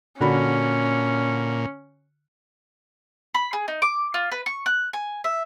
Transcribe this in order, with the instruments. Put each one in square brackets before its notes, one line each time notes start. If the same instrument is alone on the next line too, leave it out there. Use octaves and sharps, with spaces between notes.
[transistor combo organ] A#2 [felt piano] D3 F#4 B5 [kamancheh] C#4
[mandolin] B5
G#4
D#4
D6
F4
B4
C#6
F#6
G#5
E5